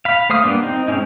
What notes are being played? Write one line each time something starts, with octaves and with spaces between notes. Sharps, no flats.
F5 B5
A3 C5 F5 D#6 F6
G3 A#3 B3 D4
C4 D#4
G#3 C4 C#4 D#4